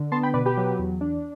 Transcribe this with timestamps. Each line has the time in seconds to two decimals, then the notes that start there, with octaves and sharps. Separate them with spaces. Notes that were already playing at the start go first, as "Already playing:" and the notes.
Already playing: D3
0.12 B3 A5 C6
0.23 G5 B5
0.34 B2 B4 D5
0.45 G4 B4
0.57 F#3
0.79 E2
1.01 D4